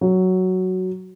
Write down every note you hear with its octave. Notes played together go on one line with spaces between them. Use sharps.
F#3